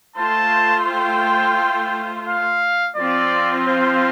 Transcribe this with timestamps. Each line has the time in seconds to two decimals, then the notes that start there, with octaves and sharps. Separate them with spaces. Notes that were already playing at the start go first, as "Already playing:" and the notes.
0.16 A3 F4 C5 A5
0.87 G5
2.27 F5
2.97 F3 C4 F4 D5
3.66 C5